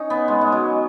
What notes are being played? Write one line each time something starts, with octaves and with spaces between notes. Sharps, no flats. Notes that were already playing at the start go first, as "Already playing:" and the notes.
Already playing: C#4 D#4
B3
G#3
G#3
F#3